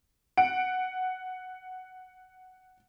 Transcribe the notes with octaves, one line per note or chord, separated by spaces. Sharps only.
F#5 D7